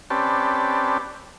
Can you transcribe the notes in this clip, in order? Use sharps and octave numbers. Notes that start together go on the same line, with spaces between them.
C4 C#4 G4 B4 D5 A5